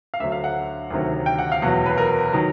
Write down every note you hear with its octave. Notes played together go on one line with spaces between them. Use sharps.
F5
D2 D3 F#3 E5
F5
F#5
D2 C3 D#3 F#3
G5
F#5
F5
E2 B2 F#3 F#5
B4
A#4
D#3 F#3